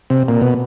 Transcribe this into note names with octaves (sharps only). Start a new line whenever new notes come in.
C3
A#2
B2